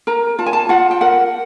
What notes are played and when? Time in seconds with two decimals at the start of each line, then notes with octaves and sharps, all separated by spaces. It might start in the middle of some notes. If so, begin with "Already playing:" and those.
0.07 A#4 A#5
0.39 F4 A5
0.46 G#5
0.53 A5
0.69 F4 F#5
0.91 G5
1.01 A#4 F#5